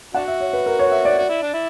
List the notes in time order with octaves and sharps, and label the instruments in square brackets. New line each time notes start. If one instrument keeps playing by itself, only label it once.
[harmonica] D4 F#4 [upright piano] F#5
[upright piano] E5
C#5
B4
A#4
C#5
E5
D5
[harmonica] F#4
E4
D4
E4